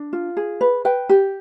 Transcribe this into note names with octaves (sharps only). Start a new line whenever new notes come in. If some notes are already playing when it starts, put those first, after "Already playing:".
Already playing: D4
F4
G#4
B4
B4 G5
G4